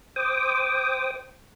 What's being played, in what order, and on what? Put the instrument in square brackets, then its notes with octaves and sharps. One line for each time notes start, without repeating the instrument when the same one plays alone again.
[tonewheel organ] C5 G5 D6 D#6